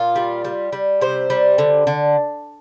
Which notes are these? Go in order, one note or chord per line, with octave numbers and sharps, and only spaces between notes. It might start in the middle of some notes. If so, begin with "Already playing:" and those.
Already playing: A#2 F4
G3
G3
G3
C3 C5
G3
D3
D3